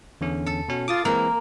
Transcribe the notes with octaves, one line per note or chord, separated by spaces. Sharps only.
E2 D3 C#4
A4
B2 C#4 F#4
F4 D6 D#6 A6
E3 G#3 A#3 C4 A#4